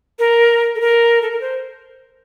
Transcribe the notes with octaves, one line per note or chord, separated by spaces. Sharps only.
A#4
A4
A#4
A4
A#4
C5